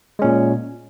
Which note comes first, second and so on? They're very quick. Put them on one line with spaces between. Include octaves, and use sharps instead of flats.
G#3 C#4 A#2